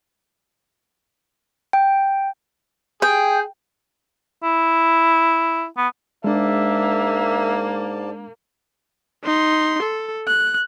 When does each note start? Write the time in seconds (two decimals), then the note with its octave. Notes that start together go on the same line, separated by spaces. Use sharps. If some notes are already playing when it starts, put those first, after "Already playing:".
1.73 G5
3.02 G#4 G5
4.43 E4
5.77 B3
6.24 G#2 G#3 A#3 D4 D5 E5 A5
9.24 D#4 C6
9.82 A4
10.28 F#6